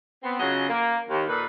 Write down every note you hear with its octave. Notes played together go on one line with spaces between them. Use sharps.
B3 C4
C#3 F#3 F4 F#4 G#4 D#5
A#3
D#2
A#2 D#4 A4 B4